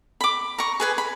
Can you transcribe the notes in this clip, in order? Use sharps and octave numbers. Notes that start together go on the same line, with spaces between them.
B5 D6
A#5 C#6
G#4 B4 G#5
B5